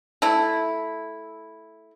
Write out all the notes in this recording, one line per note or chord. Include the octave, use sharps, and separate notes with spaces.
A3 E4